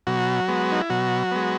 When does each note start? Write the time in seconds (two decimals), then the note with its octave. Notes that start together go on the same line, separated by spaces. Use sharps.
0.07 B2 F#3 F#4
0.48 G#3 B3
0.72 D#4
0.81 E4
0.90 B2 F#3 F#4
1.31 G#3 B3